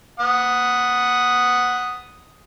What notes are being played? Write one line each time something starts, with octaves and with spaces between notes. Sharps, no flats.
F#5 D#6